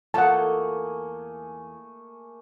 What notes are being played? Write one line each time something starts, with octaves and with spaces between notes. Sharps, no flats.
E2 A3 A#3 F4 G#4 A4 F#5 A5